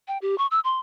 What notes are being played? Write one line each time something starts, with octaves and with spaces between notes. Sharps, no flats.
G5
G4
C#6
E6
C6